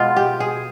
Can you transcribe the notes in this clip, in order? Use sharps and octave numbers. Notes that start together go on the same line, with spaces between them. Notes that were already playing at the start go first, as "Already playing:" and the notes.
Already playing: B2 G#3 B3 F4
G4
G#4